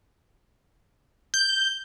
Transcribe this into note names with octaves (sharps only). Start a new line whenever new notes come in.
G6